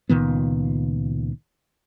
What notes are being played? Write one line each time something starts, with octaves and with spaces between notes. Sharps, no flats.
C#2 A#2 D#3 B3